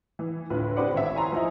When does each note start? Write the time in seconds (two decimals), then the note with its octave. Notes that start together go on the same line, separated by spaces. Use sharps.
0.19 E3
0.50 D2 A2 F4 B4
0.76 C4 G4 B4 C5 D5 F#5
0.94 G#1 C#5 E5
1.15 E4 G#5 A#5 C6
1.32 F3 D#4 E4